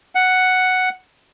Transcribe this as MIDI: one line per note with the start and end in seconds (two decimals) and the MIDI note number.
0.15 0.89 78